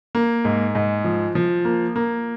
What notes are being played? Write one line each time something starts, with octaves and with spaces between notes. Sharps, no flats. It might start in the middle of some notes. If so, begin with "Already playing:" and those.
A#3
G#2
G#2
F3
F3
A#3
A#3